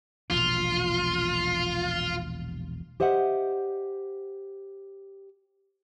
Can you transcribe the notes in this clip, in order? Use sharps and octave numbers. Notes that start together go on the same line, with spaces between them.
E1 A#1 B2 F4
G4 C5 D#5 E5 F#5